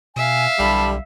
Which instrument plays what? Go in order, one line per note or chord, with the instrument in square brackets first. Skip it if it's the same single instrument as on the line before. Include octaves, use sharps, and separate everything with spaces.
[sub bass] B2 [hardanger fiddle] E5 F5 [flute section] G#5
[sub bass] B1 [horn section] D3 E3 G3 [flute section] A5 B5